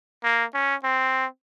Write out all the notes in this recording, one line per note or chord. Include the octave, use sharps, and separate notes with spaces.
A#3
C#4
C4